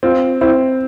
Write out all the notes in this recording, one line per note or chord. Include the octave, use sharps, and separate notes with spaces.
C4 F4
C4 E4